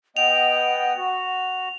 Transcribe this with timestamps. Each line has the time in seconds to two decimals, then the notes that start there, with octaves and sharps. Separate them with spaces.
0.17 B3 D#5 F#5 G5 F7
0.97 F#4